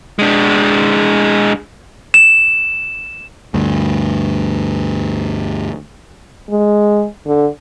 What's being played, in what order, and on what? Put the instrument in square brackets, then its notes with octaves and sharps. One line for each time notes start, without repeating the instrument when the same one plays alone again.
[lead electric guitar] G#3 D4
[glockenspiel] E7
[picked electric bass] D2 G2
[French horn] G#3
D3